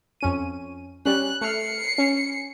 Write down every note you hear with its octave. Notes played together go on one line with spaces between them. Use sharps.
F2 C#4 D#7
G3 C#4 F#6
A3 F6 C7 C#7
C#4